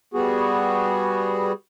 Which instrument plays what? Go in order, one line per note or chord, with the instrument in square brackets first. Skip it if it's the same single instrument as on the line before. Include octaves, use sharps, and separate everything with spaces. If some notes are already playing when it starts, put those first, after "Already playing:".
[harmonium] G3 B3 F#4 G#4